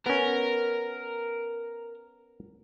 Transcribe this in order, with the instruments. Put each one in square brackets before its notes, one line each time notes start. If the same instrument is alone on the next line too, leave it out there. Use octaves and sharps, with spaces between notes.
[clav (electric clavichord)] B3 C#4 [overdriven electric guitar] A#4